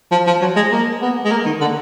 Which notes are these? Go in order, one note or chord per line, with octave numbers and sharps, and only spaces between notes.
F3
F3
F#3
G#3
A#3
B3
G#3
A#3
D#3
D3